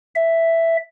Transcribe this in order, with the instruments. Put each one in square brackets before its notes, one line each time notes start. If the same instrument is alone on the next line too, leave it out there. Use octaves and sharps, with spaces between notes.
[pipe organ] E5